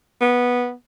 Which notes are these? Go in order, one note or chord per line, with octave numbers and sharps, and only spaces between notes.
B3